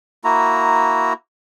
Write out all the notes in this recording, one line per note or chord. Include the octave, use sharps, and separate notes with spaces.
A#3 E4 F#4 A#5